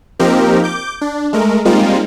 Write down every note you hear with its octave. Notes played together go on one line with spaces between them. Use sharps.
F3 A#3 C4 D#4 G4 A#4
D6 G6
D4
G#3 A3 A#4
G3 G#3 A#3 C4 D#4 F4